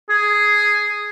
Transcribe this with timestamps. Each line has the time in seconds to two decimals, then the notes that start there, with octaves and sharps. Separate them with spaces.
0.09 G#4